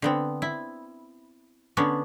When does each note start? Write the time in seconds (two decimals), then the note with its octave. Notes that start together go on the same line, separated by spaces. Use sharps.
0.02 D3 B3 C4
0.42 E4
1.77 D3 B3 C#4 D4